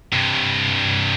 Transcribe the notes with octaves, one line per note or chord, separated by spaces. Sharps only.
G2 C3